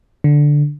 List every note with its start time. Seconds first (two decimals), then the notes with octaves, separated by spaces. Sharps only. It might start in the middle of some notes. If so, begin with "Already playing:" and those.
0.24 D3